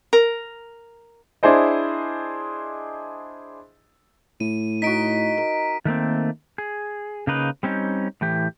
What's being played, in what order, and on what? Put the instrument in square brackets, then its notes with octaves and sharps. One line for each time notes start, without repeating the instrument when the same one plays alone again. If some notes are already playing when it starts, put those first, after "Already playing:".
[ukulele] A#4
[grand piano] D4 E4 G#4 C5 D#5
[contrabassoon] A2 [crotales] D#7
[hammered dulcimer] D#4 F#4 [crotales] B6 D7
[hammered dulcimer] A#4
[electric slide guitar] D#3 A3 A#3 C4
G#4
C#3 A#3 D#4 B4
G3 C4 C#4 D#4
A2 E3 G4